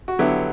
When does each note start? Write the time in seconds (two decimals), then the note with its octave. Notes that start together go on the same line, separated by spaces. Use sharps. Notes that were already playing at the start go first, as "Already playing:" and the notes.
0.08 F#4
0.19 D3 F#3 B3 E4 G4